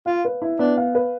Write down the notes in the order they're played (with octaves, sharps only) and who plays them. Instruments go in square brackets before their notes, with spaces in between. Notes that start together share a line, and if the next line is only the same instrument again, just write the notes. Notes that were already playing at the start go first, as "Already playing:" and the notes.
[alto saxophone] F4 [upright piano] F5
[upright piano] B4
E4
[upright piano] B3 [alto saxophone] D4
[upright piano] F5
B4